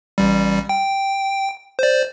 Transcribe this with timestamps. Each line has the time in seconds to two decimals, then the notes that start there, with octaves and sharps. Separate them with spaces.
0.18 A1 G3
0.69 G5
1.79 C5 D5